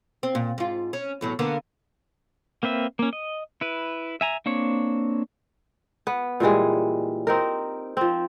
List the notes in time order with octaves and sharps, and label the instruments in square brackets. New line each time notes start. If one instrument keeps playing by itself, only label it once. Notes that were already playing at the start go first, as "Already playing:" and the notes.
[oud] C4
A#2
G#2 F4
C#4
E2 A2 F#3
D3 A#3 B3
[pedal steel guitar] A#3 C4 B4 E5
A#3 C#4
D#5
E4 B4
E5 G#5 A#5
A#3 C4 D4 C#5
[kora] B3
A#2 E3 G3 G#3
C4 D#4 A#4
F3 C4